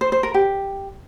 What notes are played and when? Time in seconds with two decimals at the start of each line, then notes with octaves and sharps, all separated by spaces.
0.01 C5
0.12 C5
0.23 A#4
0.34 G4